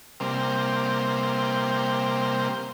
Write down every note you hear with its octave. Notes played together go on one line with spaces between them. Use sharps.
C3 G3 A#3 C4